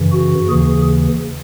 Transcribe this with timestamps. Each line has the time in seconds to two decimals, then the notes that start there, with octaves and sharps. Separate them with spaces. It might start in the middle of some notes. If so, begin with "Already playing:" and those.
Already playing: F#2 C#3 E3
0.12 F#4
0.49 D#2 C#3 E3 G#4